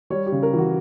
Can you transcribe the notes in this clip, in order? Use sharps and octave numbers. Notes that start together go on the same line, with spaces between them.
G3 C#5
G4
C#3
A#4
E3
F#4